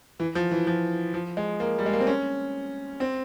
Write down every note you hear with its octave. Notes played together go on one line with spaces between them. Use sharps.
E3
F3
E3
F3
F3
G#3
A#3
G3
G#3
A#3
C4
C#4
C4